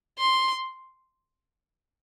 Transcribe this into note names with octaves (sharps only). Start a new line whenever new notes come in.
C6